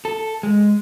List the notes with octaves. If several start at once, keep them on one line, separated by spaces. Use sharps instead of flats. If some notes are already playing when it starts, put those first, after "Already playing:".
A4
G#3